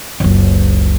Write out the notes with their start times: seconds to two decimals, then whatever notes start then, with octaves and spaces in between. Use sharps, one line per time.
0.20 F#1 C#2